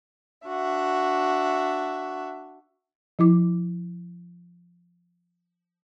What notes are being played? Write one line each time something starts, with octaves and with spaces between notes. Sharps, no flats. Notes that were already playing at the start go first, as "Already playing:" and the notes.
D4 F#4 E5
F3 E4 D6